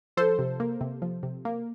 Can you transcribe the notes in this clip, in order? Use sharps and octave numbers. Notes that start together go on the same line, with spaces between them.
F3 A4 C5
C3
A#3
C3
F3
C3
A#3